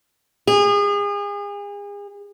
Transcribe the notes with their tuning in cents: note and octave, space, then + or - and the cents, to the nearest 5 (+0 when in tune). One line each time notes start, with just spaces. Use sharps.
G#4 -35